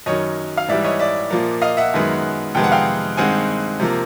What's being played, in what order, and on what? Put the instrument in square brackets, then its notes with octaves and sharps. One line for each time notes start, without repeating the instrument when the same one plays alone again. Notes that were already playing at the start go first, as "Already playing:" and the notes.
[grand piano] F#2 D#3 F#3 C#5 D#5
F5
G#2 E3 G3 D5 E5
C#5 D#5
D5 E5
A#2 F3 A#3
D#5 F5
E5 F#5
F#2 D#3 G#3 B3
F2 C3 D#3 G#3 B3 G5
F#5
F5 G5
G2 D#3 G#3 C4 F#5 G#5
C3 F3 A#3